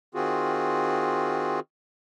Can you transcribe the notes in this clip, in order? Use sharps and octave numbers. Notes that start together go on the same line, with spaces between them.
D#3 C4 F4 F#4 G#4